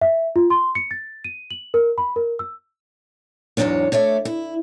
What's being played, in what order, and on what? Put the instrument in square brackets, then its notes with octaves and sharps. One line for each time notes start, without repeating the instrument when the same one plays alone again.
[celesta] E5
F4
C6
C#7
A6
D#7
F#7
A#4
B5
A#4
E6
[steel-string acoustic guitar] E2 G#2 B2 F#3 D4 C#5
A3 C#5 D5 E5
E4